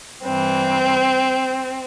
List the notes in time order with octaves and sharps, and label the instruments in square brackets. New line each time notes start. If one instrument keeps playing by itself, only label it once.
[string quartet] G2 E3 C4